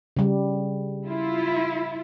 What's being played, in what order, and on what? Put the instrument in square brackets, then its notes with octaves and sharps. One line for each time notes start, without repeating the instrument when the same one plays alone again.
[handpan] C#3 G3
[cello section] E4 F4